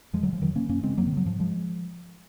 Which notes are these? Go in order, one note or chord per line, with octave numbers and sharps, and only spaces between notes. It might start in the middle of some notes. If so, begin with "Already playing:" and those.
F2 F3 G#3
C3 D#3 F#3
F3
F2 D#3 F#3
C3 A#3 C#4
F#2 A#3 C#4
C#3 G#3 C4
F#2 F#3 A#3
D#3
C#3 F#3
G#2 F3
F3 G#3